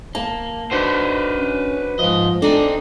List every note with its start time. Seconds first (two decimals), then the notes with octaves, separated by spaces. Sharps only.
0.15 A#3 A5
0.72 D4 D#4 F#4 B4 C5
1.38 C#4
1.99 G#2 F3 D#5
2.42 C4 D4 D#4 A4